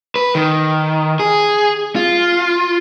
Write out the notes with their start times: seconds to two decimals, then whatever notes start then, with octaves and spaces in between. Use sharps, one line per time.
0.16 B4
0.35 D#3
1.19 G#4
1.96 F4